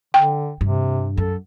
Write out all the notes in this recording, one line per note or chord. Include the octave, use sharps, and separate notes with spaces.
D3 G5
G2 C3
F#2 A4